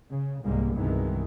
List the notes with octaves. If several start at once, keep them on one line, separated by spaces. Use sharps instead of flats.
C#3
C2 G#2 G3 G#3 A#3
C2 G2 B2 D#3 E3 G#3